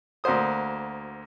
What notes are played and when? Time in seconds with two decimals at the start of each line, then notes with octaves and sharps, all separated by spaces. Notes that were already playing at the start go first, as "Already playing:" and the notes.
0.24 D2 A#3 F#4 C5 D#6